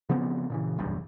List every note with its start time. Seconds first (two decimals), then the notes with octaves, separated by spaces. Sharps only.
0.09 C#3 F3 B3 C4
0.50 A#2 C#3 E3
0.78 F#1 B1 E2 G2